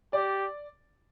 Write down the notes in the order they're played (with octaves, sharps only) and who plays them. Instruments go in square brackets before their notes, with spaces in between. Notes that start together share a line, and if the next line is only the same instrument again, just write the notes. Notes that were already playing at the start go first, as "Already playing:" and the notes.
[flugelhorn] G4 [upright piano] D5